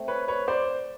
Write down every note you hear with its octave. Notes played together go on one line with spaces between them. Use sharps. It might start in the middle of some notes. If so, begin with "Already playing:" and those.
Already playing: A3 C4
B4 C#5
B4 C#5
C5 D5